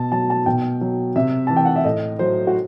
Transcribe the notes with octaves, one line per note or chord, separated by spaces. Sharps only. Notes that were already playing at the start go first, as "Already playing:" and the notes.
Already playing: B2 A5
F#3 A5
A5
B2 G5
F#3
C3 E5
E3 A5
G5
F#5
E5
A2 D#5
F#3 C5
F#4